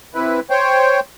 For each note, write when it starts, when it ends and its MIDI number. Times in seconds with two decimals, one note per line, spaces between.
0.15 0.40 48
0.15 0.40 64
0.15 0.40 71
0.50 1.00 72
0.50 1.00 73
0.50 1.00 79